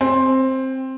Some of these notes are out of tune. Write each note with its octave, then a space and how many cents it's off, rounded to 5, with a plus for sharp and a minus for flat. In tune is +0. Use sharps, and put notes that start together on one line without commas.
C4 +10